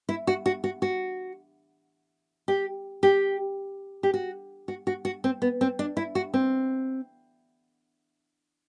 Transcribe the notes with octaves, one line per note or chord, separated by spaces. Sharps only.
E4
F#4
F#4
F#4
F#4
G4
G4
G4
F#4
F#4
F#4
F#4
C4
B3
C4
D4
E4
F#4
C4